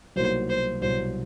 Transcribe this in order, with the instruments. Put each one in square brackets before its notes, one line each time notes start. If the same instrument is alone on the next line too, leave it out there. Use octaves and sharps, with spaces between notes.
[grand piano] C2 B2 F#3 A#3 D#4 [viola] C5
[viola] C5
[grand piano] C2 B2 F#3 [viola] C5